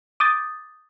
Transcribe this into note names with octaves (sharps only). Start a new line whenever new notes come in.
D6 D#6 G6 A6